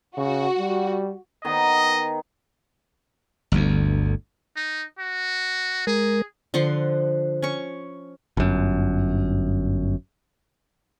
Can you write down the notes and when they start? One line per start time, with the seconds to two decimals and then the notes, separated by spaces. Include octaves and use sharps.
0.18 C#3 F#4
0.59 G3
1.45 D#3 B3 D#5
3.52 G1 D2
4.56 D#4
4.99 F#4
5.87 G#3 G#4 A#4
6.54 D3 F3 F#5 C6
7.42 C#4 C#6
8.37 G1 F#2